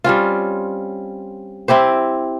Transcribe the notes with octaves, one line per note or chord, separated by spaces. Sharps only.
G3 C4 C#4 F4
C4 E4 G4 C5